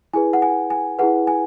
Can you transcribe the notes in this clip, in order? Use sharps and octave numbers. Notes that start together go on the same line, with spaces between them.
E4 G#4 B4 G#5
F#5
G#5
G#5
E4 G#4 B4 F#5
G#5